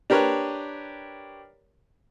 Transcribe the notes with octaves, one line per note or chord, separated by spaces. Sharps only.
D4 G4 A#4 B4 C#5